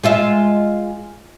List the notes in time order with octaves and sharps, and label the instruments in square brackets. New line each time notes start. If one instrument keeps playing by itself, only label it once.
[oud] G#3 F4 E5